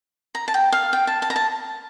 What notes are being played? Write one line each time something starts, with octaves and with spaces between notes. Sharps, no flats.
A#5
A5
G5
F5
G5
A5
A5
A#5
A5